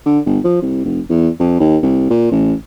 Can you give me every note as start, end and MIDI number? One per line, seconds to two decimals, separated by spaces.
0.06 0.19 50
0.26 0.39 31
0.44 0.60 53
0.62 0.84 36
0.85 1.00 29
1.09 1.29 40
1.39 1.58 41
1.60 1.77 39
1.83 2.06 36
2.10 2.30 46
2.31 2.53 33